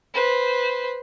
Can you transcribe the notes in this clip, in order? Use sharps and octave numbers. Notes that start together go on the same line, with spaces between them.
B4 C5